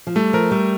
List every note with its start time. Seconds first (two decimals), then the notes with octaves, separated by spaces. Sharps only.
0.07 F3
0.15 G3 A3
0.33 F3 A#4
0.51 G3 A3